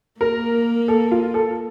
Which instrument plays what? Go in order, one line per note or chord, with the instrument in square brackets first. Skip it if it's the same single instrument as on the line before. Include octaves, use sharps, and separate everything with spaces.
[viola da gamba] A#3 [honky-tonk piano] A#4
[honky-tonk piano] A4
F4
A4